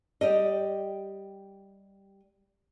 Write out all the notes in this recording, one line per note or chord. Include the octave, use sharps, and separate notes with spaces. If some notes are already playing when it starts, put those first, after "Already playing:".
G3 G4 D#5